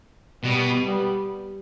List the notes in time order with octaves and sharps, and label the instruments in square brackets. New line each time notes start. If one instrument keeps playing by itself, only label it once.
[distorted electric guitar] B2 [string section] G3 B3
[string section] G3 B3